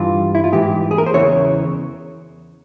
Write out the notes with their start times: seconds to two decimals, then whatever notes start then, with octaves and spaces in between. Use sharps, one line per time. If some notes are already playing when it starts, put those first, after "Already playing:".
Already playing: G2 E3 F4
0.35 E4
0.44 F4
0.52 G#2 E3 G4
0.91 G#4
0.98 A#4
1.06 C5
1.14 E2 C#3 E3 C#5